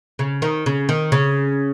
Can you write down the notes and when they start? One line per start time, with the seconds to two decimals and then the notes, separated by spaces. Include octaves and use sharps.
0.19 C#3
0.42 D#3
0.66 C#3
0.89 D#3
1.12 C#3